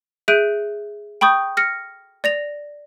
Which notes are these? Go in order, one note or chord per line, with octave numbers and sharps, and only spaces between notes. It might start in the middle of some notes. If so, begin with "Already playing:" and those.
G#4 E5 F#6 G6 D7 D#7
G5 B5 C#6 D#6 G6
F6 A#6 C#7
D5 A#6 F7